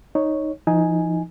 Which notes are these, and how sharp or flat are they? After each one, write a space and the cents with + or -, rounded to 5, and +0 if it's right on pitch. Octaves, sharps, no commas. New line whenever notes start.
D#4 +0 C#5 +0
F3 -40 D#4 +10 G#5 +0